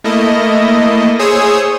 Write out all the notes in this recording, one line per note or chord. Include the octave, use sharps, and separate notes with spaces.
A3 A#3 E4 D#5
G#4 C5 C#5 D#6 E6